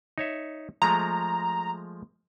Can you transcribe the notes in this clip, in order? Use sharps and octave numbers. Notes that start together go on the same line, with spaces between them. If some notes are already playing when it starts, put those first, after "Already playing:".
D#4 C#5 E5
F3 G#3 A3 A#5